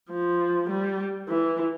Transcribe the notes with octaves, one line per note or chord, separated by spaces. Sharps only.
F3
G3
E3